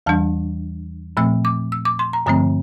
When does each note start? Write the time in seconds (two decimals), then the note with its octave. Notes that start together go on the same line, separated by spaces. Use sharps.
0.06 E2 E3 G3 D4 A5
1.17 A#2 F3 A3 C4 E6
1.45 D6
1.72 E6
1.85 D6
1.99 C6
2.13 A#5
2.26 G2 D3 F3 A3 C4 A#5